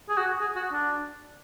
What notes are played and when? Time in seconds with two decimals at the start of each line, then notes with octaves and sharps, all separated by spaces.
0.09 G#4
0.18 F#4
0.41 G#4
0.56 F#4
0.72 D4